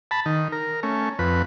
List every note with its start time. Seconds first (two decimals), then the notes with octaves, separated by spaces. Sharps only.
0.11 A5 B5
0.26 D#3
0.52 A#4
0.83 A3 C#4
1.19 F2 B4